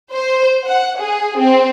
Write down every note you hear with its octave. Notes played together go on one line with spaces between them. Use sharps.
C5
F#5
G#4
C4